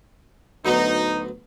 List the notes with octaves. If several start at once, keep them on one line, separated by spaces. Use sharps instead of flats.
D2 F#3 B3 D#4